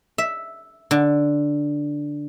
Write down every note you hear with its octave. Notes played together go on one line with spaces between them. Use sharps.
E5
D3